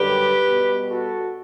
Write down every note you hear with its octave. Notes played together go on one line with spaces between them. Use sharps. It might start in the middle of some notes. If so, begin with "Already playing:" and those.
Already playing: F#2 D3 G3 G4 B4
B2 G3
F#4 A4